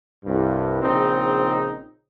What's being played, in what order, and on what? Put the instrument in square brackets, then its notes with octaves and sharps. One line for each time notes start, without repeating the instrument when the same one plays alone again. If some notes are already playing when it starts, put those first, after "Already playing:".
[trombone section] C2 G2
A#1 C#3 C4 D#4